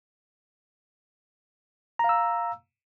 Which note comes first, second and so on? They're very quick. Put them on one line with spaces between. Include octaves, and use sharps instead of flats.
A#5 F5 E6